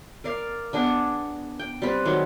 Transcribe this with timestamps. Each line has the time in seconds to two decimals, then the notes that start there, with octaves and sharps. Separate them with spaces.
0.24 A#4 D5 F5
0.73 B3 D4 G#4
1.59 G5
1.82 G3 C4 B4
2.05 D#3 F#3 G#3